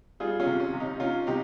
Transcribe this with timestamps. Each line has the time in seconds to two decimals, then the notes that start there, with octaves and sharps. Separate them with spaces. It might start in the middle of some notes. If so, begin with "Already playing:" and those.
0.20 G3 F4 G#4
0.40 C#4 F4
0.46 C3
0.60 C#4
0.73 C3
0.80 D#4
1.00 C#4 F4
1.27 C3 D#4 G4